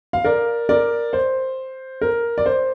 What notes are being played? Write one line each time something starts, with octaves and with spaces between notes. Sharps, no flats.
F5
A#4 D5
A#4 D5
C5
A#4
D5
C5